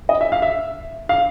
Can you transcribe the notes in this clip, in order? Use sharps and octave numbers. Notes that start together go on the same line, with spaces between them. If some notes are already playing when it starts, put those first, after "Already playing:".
D#5
E5
F5
E5
F5